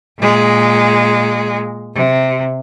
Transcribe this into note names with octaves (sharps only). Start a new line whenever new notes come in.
A#2 G#3
C3